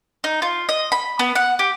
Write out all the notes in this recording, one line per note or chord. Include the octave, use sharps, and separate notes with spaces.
D#4
F4
D#5
B5
B3
F#5
G4